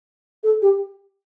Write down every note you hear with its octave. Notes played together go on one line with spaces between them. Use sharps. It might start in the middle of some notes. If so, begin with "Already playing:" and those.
A4
G4